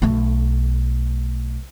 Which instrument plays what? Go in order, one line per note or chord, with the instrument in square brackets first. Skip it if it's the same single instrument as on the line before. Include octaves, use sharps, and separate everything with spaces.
[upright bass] B1 A3